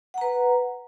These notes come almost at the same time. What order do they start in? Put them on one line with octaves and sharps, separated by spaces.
F#5 A#5 B4